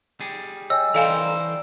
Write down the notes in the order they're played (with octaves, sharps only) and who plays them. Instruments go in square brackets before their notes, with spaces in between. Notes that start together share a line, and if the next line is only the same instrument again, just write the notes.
[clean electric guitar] G3 G#4
[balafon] C#5 [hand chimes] D#5 G5 G#5 [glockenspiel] E6
[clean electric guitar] E3 A#4 C5 [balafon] A4 F5 G#5 [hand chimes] D5